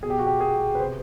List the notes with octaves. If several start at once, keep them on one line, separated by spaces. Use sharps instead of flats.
B2 G#4
G4
F#4
G4
G#4
B4
C3 C5